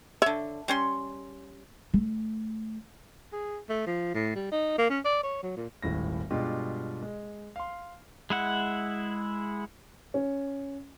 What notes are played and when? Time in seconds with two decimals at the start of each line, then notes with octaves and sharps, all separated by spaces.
0.22 D3 C#5 E5
0.68 G3 C#4 C6
1.94 A3
3.32 G#4
3.69 A3
3.86 F3
4.14 A2
4.36 G3
4.52 D#4
4.78 A#3
4.90 C#4
5.05 D5
5.23 C#5
5.43 F#3
5.56 A#2
5.82 D#1 G#1 A2 A#6
6.30 G2 B2 G#3 D4 F4 G4
7.02 G#3
7.56 F5 C6
8.30 G#3 E4 F#5
10.14 C#4